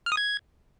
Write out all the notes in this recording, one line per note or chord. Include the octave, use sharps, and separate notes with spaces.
F6
D#6
G#6